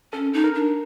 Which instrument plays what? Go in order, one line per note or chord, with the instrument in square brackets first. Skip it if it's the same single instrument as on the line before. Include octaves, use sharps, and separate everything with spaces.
[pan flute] C#4 [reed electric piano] A4
[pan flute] D#4
[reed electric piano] A#4
[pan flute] D4